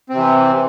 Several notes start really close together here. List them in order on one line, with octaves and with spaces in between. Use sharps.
C4 C3 E3